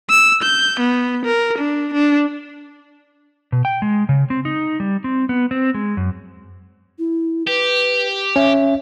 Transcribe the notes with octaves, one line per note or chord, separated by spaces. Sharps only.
E6
G6
B3
A#4
D4
D4
B2
G5
G#3
C#3
C4
D#4
G3
C4
B3
C4
G#3
F#2
E4
G4 B4
C#4 E5